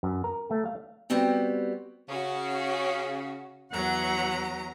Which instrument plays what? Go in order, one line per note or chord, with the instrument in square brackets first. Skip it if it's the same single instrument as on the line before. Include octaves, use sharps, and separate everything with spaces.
[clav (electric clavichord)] F#2
A#4
A3
F5
[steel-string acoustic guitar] G3 B3 C4 F#4 G4
[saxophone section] C#3 [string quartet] C#4 F#4
[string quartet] E2 F#3 A#5 [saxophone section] F#5